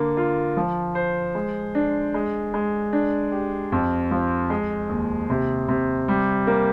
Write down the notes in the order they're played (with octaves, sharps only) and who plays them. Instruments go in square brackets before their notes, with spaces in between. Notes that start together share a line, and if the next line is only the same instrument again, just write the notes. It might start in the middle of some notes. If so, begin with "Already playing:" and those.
Already playing: [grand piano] D3 A#3
F4
F3
C5
G#3
D4
G#3
G#3
D4
G4
F2
F3
G#3
D#2
C3
C3
G3
A#3